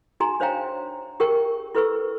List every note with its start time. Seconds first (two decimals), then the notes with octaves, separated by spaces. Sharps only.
0.20 D#4 F#4 G#4 G#5 A#5
0.40 D4 C5 C#5 F5 G5 A#5
1.20 G4 G#4 A#4 G5 C#6
1.75 E4 A4 B4 C#6 E6